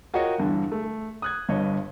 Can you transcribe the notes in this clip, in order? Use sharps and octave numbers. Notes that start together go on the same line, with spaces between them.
F4 F#4 A#4 C#5 D#5 G5
E2 G2 D3 E3
A3
D#6 F#6 G#6
G1 G2 C#5 D#5